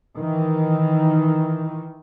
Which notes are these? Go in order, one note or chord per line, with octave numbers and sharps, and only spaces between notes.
D#3 E3